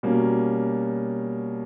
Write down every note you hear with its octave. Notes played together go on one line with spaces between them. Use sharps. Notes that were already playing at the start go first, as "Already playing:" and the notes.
B2 G3 A#3 C#4